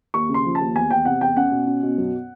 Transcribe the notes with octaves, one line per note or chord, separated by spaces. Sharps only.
D#2 C#6
C#3
C6
F3
A5
D#2
E2 G#5
E2 G5
C3 F#5
E2 G5
C#4 F#5
B2
C#4
B2
F#2